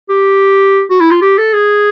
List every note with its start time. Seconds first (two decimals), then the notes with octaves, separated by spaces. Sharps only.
0.09 G4
0.90 F#4
1.00 E4
1.11 F4
1.22 G4
1.38 A4
1.54 G#4